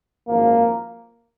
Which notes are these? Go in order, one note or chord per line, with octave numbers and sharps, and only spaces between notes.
G#1 F#2 F3 A#3